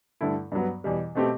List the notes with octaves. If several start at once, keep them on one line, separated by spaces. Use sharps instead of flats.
G2 D3 A3 E4 A4
G2 F#3 B3
E2 B2 G3
B2 A3 C4 G4